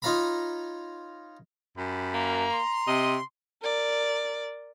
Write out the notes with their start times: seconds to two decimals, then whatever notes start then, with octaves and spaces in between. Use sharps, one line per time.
0.02 D#4 F4 C#5 F5 A#5 B5
1.77 F#2 G4 A5 B5
2.14 A#3 A#5
2.51 C6
2.88 C3 D#5
3.62 A#4 D5